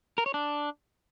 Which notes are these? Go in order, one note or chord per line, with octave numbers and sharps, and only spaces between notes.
A#4
C#5
D4